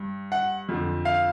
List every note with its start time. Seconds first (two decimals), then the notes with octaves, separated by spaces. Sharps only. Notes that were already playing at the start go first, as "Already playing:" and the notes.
Already playing: G2
0.32 F#5
0.69 F2 D3 F3
1.05 F5